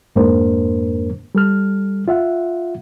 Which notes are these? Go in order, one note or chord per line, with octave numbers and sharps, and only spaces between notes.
F2 G#2 A#3 D4 A#4 C5
G3 A4 F6
F4 E5 F#5